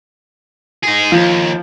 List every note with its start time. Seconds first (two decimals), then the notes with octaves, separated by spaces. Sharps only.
0.83 D#4 G#4
1.12 D#2 F3